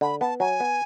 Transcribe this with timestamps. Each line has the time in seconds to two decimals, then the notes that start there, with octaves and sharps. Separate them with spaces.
0.01 D3 B5
0.21 B3 A5
0.40 F#3 G#5
0.60 B3